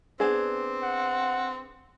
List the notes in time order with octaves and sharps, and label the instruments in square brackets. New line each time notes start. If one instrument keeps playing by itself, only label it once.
[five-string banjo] B3 D4 G#4 [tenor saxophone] C4
[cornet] F#5